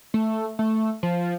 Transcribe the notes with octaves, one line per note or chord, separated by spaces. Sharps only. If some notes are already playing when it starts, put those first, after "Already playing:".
A3
A3
F3